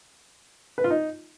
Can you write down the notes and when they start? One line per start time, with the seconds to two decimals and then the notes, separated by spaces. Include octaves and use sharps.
0.78 B4
0.84 F4
0.90 D#4